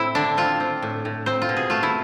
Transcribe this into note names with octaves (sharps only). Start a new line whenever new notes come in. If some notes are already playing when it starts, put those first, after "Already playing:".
Already playing: A2 C4 E4
D3 D4
C4 F4
C4
A2
A2
C4 C5
F4
B2
G#4
A3 F4
E4